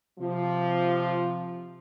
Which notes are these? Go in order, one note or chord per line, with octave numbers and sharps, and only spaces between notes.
C3 F3